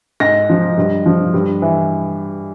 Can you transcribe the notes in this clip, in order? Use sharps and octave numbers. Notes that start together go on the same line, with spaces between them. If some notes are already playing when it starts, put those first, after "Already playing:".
G#2 A#6
F3
G2
F3
G2
E3